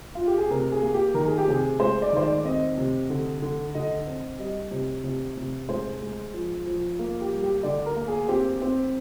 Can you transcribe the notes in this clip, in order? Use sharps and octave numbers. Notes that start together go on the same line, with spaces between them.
F4
G4
G#4
C3 A#4
G#4
A#3
G4
D#3 A#4
G#4
G4
C3 G#4
G#3 C5
D5
D#3 C5
D5
C4 D#5
C3
D3
D3
D3 D#5
C4
G3 D#5
C3
C3
C3
G#3 C5
G#3
F3
F3
A#3
G4
G3
G4
D3 D5
A#4
A#3
G#4
C4 G4
C4